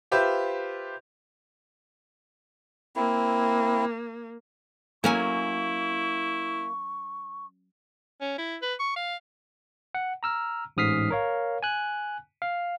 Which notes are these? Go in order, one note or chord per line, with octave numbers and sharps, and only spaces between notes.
F4 G4 B4 C5 E5
A#3 C4 E4
F#3 A#3 C#4 E4 G#5 C#6
C#4
E4
B4
C#6
F5
F#5
A#5 E6 F6
A1 G#2 D#6 F6 B6 C7
A#4 C#5 F5
G#5 F#6
F5